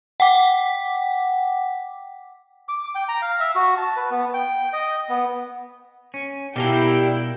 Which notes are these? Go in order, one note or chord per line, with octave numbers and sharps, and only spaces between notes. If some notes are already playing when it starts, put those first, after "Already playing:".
F#5 G5 D6 B6
D6
G5
A#5
F5
E5
F#4
A5
B4
B3
G5
D#5
B3
C#4
B2 G3 D4 E4 A#4 F5 G5